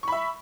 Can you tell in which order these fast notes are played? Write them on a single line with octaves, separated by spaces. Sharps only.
C#6 B5 E5